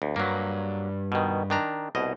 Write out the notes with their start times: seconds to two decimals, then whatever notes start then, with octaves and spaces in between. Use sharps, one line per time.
0.02 D2
0.16 G2 F#3 A#3
1.12 B2 D#3
1.50 D#3 D4 A#5
1.95 C2 B2 D#5